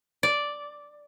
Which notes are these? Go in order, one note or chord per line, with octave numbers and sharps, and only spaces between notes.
D5